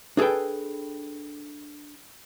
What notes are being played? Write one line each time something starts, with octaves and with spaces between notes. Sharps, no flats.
D4 G#4 A4 B4 G5